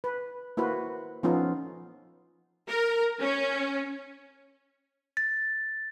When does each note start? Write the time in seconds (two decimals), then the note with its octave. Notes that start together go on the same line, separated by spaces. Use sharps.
0.04 B4
0.57 A#3 E4 F#4 B4 C5
1.23 F3 B3 C#4 D#4 F4 A4
2.69 A#4
3.20 C#4
5.17 A6